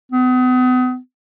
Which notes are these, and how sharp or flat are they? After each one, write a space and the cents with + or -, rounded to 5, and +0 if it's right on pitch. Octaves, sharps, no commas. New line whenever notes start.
B3 +40